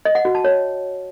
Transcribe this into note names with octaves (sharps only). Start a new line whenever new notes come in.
D#5
F#5
F#4
A5
C#5